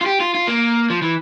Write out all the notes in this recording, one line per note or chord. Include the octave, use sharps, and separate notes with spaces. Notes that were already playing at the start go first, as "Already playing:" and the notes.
F4
G4
F4
F4
A#3
F3
E3